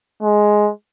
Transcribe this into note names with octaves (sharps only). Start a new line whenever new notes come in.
G#3